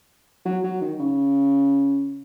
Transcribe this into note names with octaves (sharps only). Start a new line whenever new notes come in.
F#3
F#3
D#3
C#3